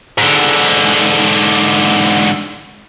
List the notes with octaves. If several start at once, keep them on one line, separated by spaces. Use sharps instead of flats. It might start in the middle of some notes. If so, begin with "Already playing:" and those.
G#2 D3